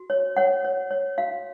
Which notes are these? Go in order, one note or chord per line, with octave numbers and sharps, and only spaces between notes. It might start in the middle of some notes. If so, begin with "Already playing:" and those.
Already playing: F#4
C#5
C#5 F#5
C#5
C#5
F#4 F5